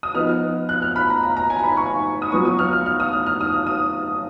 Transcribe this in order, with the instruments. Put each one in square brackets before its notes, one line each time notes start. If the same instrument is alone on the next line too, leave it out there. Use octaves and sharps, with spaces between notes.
[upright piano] D#6
F3 B3 D#4 F6
F#6
F6
B5
A#5
A#5
A#5
G#5
A#5
B5
C#6
D#6
F#3 B3 F4 C#6
D#6
F6
F6
F6
D#6
F6
F6
D#6
F6
D#6